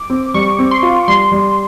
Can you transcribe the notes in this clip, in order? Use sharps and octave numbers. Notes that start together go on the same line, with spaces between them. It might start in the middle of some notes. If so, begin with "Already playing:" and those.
Already playing: D6
C4
G3 C#6
C4
C6
F4
G3 C6
G3